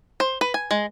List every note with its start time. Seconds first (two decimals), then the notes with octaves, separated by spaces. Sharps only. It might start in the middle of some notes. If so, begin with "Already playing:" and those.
0.20 C5
0.41 B4
0.54 G#5
0.71 G#3